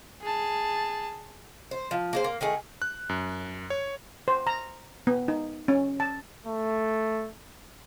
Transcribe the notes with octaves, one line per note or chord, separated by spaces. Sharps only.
G#4 A5
C5
F3
A#3 G#4 C5
A#3
D#3 A3 G#4
F#6
F#2
C#5
C5
A#5
B3
D#4
C#4
A5
A3